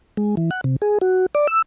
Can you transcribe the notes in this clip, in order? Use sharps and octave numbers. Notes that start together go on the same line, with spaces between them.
G#3
E3
F#5
C3
G#4
F#4
D5
E6